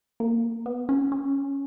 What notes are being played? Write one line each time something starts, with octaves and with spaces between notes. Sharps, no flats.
A#3
B3
C#4
C#4